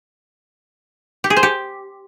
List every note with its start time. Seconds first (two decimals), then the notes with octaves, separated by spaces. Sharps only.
1.24 G4
1.30 G#4
1.37 C5
1.43 G4